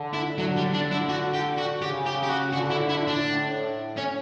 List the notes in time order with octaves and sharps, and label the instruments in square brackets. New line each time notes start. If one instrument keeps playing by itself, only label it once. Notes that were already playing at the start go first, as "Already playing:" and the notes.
Already playing: [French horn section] D3
[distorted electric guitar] E4
[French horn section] D3 [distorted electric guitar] F#3
[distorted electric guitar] G3
D4
E4
F#4
G4
F#4
[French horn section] C#3 [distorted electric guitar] G4
[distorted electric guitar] G4
G4
F#4
[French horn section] D3 [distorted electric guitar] F#4
[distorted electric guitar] E4
E4
D4
[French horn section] A2
[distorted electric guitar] C#4